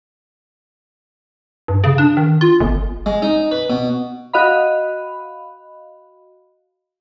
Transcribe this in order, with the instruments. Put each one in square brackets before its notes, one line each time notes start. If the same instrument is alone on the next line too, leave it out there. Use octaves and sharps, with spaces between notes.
[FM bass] G2
C#3
D4
D#3
F4
G1
[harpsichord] G#3
D#4
B4
B2
[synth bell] F#4 D#5 F5 B5